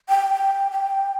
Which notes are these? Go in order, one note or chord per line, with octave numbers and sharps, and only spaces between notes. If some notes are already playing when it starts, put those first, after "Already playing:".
G5
G5
G5